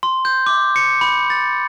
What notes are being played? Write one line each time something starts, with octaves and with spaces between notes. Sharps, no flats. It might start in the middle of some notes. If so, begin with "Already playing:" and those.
C6
G6
D6
C#7
B5
A6